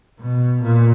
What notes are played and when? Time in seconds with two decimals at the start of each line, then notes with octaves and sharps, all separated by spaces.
0.19 B2
0.62 A#2